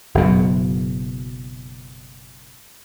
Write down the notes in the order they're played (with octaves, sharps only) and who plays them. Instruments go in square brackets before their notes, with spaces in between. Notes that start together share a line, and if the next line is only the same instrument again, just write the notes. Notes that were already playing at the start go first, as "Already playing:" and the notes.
[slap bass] F#1 F#2 B2